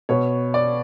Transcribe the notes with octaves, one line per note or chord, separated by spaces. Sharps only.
B2 C#5
D5